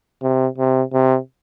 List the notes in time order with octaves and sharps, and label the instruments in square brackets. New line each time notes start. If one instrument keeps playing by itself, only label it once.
[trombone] C3
C3
C3